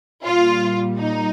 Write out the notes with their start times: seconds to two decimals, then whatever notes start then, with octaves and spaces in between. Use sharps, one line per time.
0.25 A#2 G3 F4
0.99 D#4